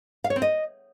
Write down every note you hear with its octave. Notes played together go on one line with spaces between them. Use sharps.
F5
C#5
C4
D#5